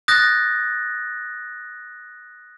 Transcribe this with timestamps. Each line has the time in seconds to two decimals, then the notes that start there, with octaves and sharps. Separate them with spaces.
0.08 D#6 F#6 G6 A6 A#6